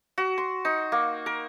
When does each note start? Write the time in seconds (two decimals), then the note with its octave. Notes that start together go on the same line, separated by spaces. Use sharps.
0.18 F#4
0.38 C6
0.65 D#4
0.92 A#3
1.26 A#4